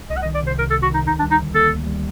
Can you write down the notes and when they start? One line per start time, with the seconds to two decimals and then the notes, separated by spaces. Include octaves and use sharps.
0.10 C2 D#5
0.17 F#5
0.22 D#5
0.26 D#3
0.34 D5
0.43 C3 C5
0.59 C2 A#4
0.70 A4
0.74 C2
0.82 F#4
0.90 D#3 D#4
1.07 D2 D#4
1.19 D4
1.22 G3
1.31 D#4
1.38 D3
1.54 A#3 A4
1.70 D2
1.87 G3